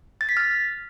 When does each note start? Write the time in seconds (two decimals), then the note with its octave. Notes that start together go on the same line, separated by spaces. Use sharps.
0.21 A6
0.29 B6
0.37 F6